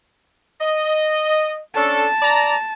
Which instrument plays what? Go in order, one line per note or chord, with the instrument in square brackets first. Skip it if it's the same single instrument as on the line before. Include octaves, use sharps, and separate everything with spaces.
[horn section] D#5
[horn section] C#4 D4 A4 [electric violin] A5
[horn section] D5 A#5